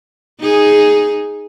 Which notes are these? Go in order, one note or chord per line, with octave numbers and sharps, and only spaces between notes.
D#4 G#4